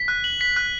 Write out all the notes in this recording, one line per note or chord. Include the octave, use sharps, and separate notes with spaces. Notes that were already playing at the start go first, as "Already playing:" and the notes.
Already playing: B6
F#6
F#7
B6
F#6